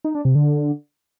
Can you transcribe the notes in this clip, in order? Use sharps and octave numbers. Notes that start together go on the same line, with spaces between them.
D#4
D4
C3
D3